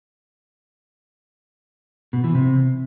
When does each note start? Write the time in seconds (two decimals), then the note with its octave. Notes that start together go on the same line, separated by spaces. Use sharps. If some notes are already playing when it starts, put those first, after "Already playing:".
2.13 B2
2.24 E3
2.35 C3